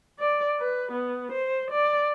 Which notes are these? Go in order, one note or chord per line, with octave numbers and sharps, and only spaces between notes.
D5
B4
B3
C5
D5